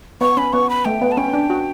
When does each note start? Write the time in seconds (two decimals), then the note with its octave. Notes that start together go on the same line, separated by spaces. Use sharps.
0.21 B3 C#6
0.37 C#4 B5
0.53 B3 C#6
0.70 B5
0.85 A3 G5
1.01 B3
1.12 A5
1.17 C#4 G5
1.28 C#4
1.33 D4
1.50 F#4